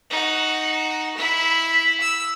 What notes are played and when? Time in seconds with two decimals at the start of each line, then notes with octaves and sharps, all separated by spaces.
0.10 D#4 F#4
1.17 E4 E5
2.01 E6